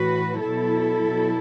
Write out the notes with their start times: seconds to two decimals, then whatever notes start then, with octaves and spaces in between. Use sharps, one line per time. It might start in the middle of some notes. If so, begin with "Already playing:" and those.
Already playing: A2 E3 F#4 B4
0.39 B2 F#3 E4 A4
1.05 B2 F#3